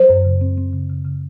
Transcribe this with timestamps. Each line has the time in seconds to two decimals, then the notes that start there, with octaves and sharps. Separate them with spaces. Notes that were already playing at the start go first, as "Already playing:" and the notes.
Already playing: F#3 C5
0.09 F#2
0.25 C#3
0.41 C4
0.58 C4
0.73 C#3
0.90 C#3
1.05 C#3